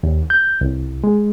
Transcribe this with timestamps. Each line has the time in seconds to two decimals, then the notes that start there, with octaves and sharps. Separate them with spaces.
0.03 D#2
0.30 G6
0.61 C2
1.04 G#3